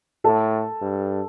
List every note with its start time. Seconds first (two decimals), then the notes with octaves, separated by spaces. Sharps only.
0.24 A2 A4
0.81 G2